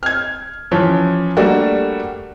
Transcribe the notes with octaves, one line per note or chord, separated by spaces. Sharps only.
F6 G#6
E3 F3 C#4
G3 A3 A#3 D4 F#4